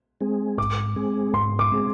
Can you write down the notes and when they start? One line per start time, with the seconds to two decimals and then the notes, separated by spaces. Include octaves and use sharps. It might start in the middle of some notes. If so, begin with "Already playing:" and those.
0.21 G#3 C4 G#4
0.58 G#2 D6
0.96 G#3 C4 G#4
1.33 G#2 C6
1.59 D6
1.72 G#3 C4 G#4